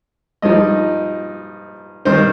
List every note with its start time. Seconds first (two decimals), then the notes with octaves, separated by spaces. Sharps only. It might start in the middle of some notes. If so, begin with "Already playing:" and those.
0.42 G2 F3 D#4 D#5
2.05 G2 D#3 C4 D#4 C5